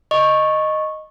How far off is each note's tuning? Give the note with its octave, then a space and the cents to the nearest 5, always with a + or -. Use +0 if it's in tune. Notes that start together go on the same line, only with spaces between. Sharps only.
D#5 -5 C#6 -10